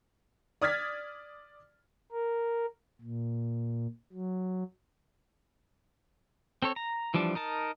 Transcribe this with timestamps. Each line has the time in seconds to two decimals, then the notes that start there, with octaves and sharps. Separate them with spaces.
0.61 D5 D#6 F6 G#6 A6 B6
2.12 A#4
3.01 A#2
4.13 F#3
6.62 C4 A4 C#5
6.76 A#5
7.14 E3 F3 G3 D4
7.35 D#4 A#4 A5